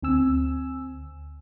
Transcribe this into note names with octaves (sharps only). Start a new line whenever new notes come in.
D2 C4 G#5 E6